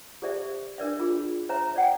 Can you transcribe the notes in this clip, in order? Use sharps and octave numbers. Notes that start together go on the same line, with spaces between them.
G4 A4 C5 D5 E5
D4 A#4 D5 E5
F4 G#4
C5 C#5 E5 A#5
D5 F#5 G5